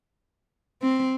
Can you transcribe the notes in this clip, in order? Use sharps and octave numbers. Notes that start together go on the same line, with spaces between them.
C4